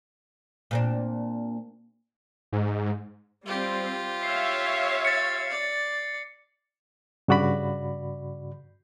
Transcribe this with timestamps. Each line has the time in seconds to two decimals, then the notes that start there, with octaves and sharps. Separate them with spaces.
0.71 A#2 C4 D4
2.52 G#2
3.46 G3 C4 F4 G4
4.23 C#5 E5 F5 C7
5.05 A6 C#7
5.50 D5
7.28 G2 C#3 F#4 D5 B5